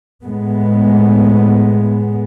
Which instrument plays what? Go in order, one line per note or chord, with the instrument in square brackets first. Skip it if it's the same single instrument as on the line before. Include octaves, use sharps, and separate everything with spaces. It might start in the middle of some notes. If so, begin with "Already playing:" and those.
[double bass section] A2 G#3 B3